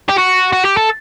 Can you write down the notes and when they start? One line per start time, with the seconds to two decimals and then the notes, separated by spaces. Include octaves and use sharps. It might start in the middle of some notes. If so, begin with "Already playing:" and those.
0.09 G4
0.17 F#4
0.53 F#4
0.65 G4
0.77 A4